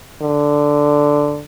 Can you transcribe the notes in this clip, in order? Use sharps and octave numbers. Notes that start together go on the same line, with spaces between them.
D3